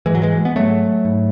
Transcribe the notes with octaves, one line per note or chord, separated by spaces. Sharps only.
G#2 E3 G#3
F#3
E3 G#3
B3
G#2 F#3 A3
G#2